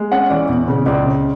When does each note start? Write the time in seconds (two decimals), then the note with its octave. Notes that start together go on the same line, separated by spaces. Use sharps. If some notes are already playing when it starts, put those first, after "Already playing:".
Already playing: G#3
0.12 C#4 F#5
0.30 E3 D5
0.49 E2
0.68 C#3
0.86 C#2 D5
1.06 C#3